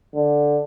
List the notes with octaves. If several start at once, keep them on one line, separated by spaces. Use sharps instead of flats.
D3